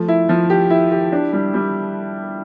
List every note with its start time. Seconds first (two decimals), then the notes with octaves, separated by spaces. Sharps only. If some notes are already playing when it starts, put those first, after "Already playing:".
Already playing: F3 A3
0.08 E4
0.29 F3
0.50 G4
0.70 E4
0.91 G4
1.12 D4
1.33 G3
1.54 G3